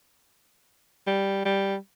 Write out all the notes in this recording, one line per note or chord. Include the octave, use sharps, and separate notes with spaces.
G3
G3